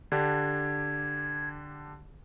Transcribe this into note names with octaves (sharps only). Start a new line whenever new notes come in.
D3 D4 G4 G#6